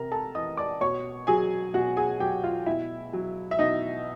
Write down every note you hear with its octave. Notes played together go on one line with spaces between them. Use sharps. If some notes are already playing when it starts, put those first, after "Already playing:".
Already playing: C3 A#4 A#5
A4 A5
E3 D#5 D#6
D5 D6
B2 C#5 C#6
F#3 G#4 G#5
B2 F#4 F#5
G#4 G#5
F#3 G4 G5
F4 F5
B2 E4 E5
F#3
E5
B2 D#4 D#5